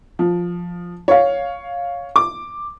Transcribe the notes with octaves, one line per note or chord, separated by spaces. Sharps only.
F3
C#5 F5
D6